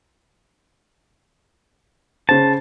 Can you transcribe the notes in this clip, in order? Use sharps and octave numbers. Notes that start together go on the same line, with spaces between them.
C#3 C5 A5